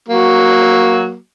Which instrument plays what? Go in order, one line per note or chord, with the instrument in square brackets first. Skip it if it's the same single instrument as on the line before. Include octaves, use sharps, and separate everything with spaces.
[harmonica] F#3 A#3 F#4